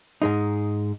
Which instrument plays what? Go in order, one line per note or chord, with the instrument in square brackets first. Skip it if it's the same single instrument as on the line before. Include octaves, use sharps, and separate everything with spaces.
[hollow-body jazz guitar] G#2 G#3 D#4